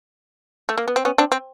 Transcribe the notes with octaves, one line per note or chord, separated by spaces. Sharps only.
A3
A#3
B3
C4
B3 C#4
C4 D4
C4